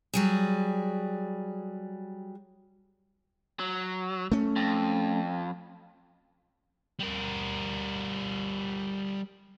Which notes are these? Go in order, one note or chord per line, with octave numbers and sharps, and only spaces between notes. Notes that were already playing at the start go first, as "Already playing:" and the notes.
F#3 G3 G#4
F#3
A3 C#4
F2
G3 A#4